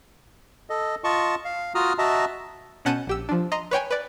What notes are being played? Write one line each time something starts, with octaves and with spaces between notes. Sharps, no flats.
A4 D#5
F4 D#5 A5 C#6
F5
F4 F#4 A#5 D#6 F6
F#4 D#5 E5 A5 A#5
B2 C#4 F#5 A5 G6 D#7
A#1 G4 E6
F3 D4
D#5 A#5 C6
B4 C#5 G5 G#5
B4 D5